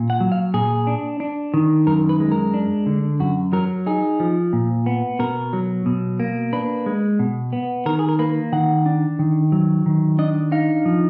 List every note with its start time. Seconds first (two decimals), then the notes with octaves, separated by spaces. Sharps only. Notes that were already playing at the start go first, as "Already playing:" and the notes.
Already playing: A#2
0.10 F#5
0.20 F#3
0.32 F5
0.54 A#2 G#4
0.87 D4
1.20 D4
1.54 D#3
1.87 F#2 A#4
2.09 B4
2.20 G#3
2.32 A#4
2.54 D4
2.86 D3
3.20 F#2 F#4
3.53 F#3 A#4
3.86 D#4 G#4
4.20 F3
4.53 A#2
4.86 B3
5.19 B2 A#4
5.53 F#3
5.86 B2
6.20 A#3
6.53 D4 B4
6.86 G#3
7.19 B2
7.53 B3
7.86 D#3 A#4
7.99 G#4
8.09 A#4
8.19 A#3 B4
8.52 D#3 F#5
8.86 D4
9.19 D#3
9.52 F#3
9.86 D#3
10.19 D4 D#5
10.52 D#4 F5
10.85 F3